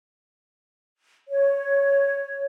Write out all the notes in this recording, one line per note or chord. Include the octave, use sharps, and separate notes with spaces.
C#5